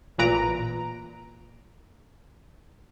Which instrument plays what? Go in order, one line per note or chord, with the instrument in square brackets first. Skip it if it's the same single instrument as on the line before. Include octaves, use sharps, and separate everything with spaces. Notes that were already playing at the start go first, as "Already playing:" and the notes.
[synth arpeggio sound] A1 A#2 B4 A#5 D7